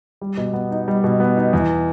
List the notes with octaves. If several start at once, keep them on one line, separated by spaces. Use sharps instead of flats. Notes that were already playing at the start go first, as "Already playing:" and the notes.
G3
B2
B3
D#4
G3
B2
B3
D#4
E2